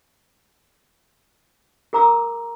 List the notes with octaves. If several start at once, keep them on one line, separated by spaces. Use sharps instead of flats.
G#4 A#4 A#5 D6 E6